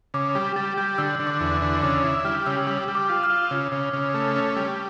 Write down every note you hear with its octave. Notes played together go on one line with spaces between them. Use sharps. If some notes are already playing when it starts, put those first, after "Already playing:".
C#3 D6
G3 D6
G3 A6
G3 G6
D3 E6
D3
D6
E2
D6
D3
C#3 D6
E4
G3 F6
C#3 E6
G3 D6
G3
D6
F4
F6
F4
C#3
C#3
C#3
A3
C#4
G3